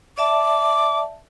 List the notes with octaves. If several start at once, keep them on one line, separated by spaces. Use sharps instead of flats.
D5 E5 A5 D6